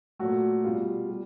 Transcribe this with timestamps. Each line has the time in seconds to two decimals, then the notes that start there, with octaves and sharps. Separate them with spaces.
0.19 A#2 F#3 A3 F#4
0.64 B2 G3 F4
1.09 G3